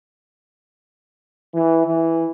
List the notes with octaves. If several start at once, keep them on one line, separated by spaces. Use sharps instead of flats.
E3
E3